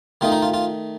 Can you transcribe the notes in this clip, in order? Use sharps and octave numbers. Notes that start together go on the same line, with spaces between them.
D#3 A3 D#4 F4
D#4
F4
F4